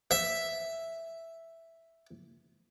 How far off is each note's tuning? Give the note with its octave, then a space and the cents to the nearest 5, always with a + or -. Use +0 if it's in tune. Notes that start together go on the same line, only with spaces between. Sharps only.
E5 +0